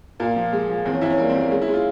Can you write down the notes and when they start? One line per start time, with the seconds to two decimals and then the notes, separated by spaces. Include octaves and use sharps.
0.20 A#2 A#3
0.36 F3
0.53 G#3
0.69 F3
0.85 E2 C4
0.94 C#4
1.01 E2 E4
1.10 C#4
1.18 G3 A#3
1.29 C4
1.35 E2
1.40 A#3
1.51 G#3 C#4
1.62 E4
1.68 G#3
1.73 F4